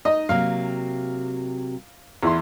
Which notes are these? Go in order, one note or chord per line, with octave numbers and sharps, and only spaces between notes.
D#4 D#5
C3 F#3 A#3 F5
E2 E4 C6